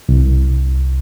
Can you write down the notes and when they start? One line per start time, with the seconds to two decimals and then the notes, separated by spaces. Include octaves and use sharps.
0.09 C2